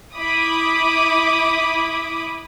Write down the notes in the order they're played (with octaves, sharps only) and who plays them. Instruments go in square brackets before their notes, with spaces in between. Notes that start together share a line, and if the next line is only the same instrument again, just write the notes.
[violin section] E4 B5 D6 D#6